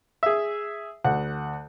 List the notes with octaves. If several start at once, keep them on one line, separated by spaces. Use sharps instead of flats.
G#4 E5
D2 F#5